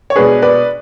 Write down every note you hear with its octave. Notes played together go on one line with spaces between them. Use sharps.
C#5
B2 G#3 D4 G#4 B4
B4 D5